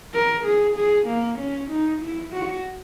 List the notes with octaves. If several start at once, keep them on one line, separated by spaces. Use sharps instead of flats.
A#4
G#4
G#4
A#3
C#4
D#4
E4
F#4